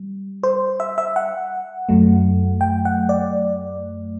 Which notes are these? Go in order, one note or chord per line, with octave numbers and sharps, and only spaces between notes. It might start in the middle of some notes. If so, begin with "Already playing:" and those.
Already playing: G3
C5
E5
E5
F#5
F#2 F#3 A3
G5
F#5
D5